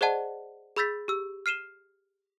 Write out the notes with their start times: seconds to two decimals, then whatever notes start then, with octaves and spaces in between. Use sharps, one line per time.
0.01 G#4 C5 D5 D#5 F#5 A5
0.77 G#4 B5 E6 G6 A6 B6
1.08 G4 E6
1.46 F6 C7 D#7 E7 G7